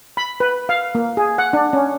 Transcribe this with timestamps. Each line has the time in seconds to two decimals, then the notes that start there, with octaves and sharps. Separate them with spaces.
0.17 B5
0.40 B4
0.69 F5
0.95 A#3
1.17 G#4
1.38 F#5
1.53 D4
1.73 C#4